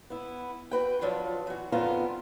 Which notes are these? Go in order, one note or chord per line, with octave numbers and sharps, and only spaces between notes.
B3 E4
F#4 B4 G5
F3 F#3 D4 F4
E3 F#4
F2 D3 D#3 B3 F4 A#5